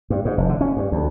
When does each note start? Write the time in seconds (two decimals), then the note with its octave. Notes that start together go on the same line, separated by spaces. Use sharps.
0.10 G2
0.25 G#2
0.38 F1
0.49 D3
0.61 C#4
0.77 G2
0.92 D2